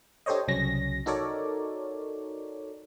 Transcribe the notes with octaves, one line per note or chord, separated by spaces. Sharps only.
D4 G4 A4 C5 C#5 D#5
C2 C#3 F#3 C#4 A#6
D#4 F#4 A4 A#4 C#5 D5